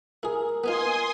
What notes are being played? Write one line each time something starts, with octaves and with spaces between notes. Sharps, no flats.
E4 G#4 A#4
B3 D#4 F4 G#5 C6 D#6